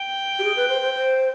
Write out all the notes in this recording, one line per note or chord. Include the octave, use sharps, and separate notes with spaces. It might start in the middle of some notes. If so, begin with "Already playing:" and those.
Already playing: G5
G4
G#4
B4
C5
C5
C5